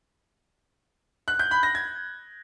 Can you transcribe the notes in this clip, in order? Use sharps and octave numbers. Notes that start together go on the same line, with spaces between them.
F#6
G6
B5
A#6
G#6